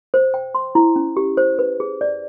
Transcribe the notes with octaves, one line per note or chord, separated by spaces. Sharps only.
C5
G5
C6
E4
C#4
G4
C5
B4
G#4
D5